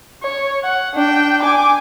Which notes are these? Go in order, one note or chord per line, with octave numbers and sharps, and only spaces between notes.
C#5
F#5
D4 G5
G#5 D6